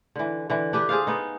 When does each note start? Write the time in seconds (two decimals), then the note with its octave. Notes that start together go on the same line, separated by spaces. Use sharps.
0.16 D3 E3
0.50 D3 E3
0.73 D4 G4 B4
0.89 G#4 C5 D5 F5
1.07 B3 D#4